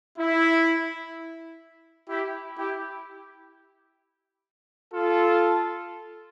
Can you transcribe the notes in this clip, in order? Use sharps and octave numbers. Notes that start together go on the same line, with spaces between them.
E4
E4 G4
E4 G4
F4 A4